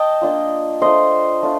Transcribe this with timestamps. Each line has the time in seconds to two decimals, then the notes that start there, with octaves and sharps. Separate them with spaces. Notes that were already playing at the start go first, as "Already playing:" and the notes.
Already playing: D#5 G5 A5
0.21 A#3 D4 F4
0.82 A3 D4 F4 C5 D#5
1.43 A3 D4 F4